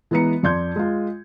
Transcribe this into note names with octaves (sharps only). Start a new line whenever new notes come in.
E3 G#3 B3 A#5 C#7
F2 D5 C6 G6 G#6
G#3 F4